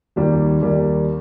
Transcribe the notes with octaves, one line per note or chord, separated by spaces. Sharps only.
D#2 D#3 G3 A#3
D#2 D#3 G3 A#3